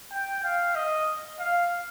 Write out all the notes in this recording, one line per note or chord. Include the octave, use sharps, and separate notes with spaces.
G5
F5
D#5
F5